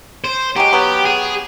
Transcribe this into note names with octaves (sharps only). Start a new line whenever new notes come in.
C5
F#3 G#3 G4
F#3 B3
G#4